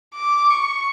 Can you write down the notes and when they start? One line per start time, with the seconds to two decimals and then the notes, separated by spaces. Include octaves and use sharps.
0.14 D6
0.50 C#6